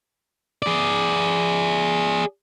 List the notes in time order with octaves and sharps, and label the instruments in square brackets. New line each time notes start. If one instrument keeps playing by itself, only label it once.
[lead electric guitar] G#4 D5